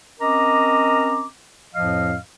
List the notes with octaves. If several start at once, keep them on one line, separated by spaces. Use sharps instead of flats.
C4 C#4 A#4 D#5 A#5 D6
F2 A2 F3 D#5 F5 F6